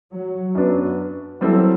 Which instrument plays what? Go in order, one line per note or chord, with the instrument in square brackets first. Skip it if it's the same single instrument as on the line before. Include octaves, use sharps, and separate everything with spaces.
[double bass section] F#3
[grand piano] F#2 F#3 B3 D4
[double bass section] F#3 [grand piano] G3 C4 E4 A4